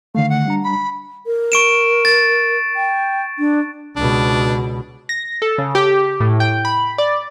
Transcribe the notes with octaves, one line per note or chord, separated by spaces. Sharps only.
D3 D#3 A3 F5
F#5
G3 D4 A#5
B5
A#4
C#6 D7 E7
A6
G5
D4
C#2 B2 D4
A#6
A4
C#3
G4
A2
G5
B5
D5